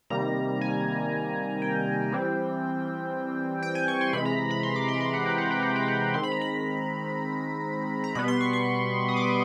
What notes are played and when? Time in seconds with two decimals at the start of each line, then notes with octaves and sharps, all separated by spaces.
0.10 C3 D#3 G3 A#3 A#5
0.61 G#5
1.62 G5
2.12 E3 G3 C4
3.63 G5
3.75 G#5
3.88 C#6
4.01 C6
4.13 C3 E3 G#3 B5
4.25 A#5
4.51 B5
4.63 C6
4.76 D6
4.88 C6
5.01 C6
5.13 F#5
5.26 G5
5.38 F#5
5.51 G5
5.63 F#5
5.76 G5
5.88 F#5
6.14 D#3 G#3 C4 C6
6.23 B5
6.32 A#5
6.42 B5
8.04 A#5
8.15 B2 G3 B3 B5
8.28 C6
8.41 C#6
8.53 C#6
9.08 D#6
9.16 D6